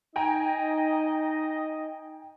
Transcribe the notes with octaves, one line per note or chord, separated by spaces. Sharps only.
D#4 D#5 G5 G#5 A#5